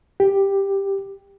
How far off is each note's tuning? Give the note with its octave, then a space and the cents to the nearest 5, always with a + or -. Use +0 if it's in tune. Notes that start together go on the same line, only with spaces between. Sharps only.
G4 +5